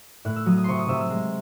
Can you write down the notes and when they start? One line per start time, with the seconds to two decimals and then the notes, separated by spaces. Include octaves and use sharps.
0.25 A2 F#6
0.36 E6
0.46 F#3 D#6
0.57 D#6
0.64 C3 C6 C#6
0.79 D#6
0.88 C3 E6
1.00 E6
1.10 G#3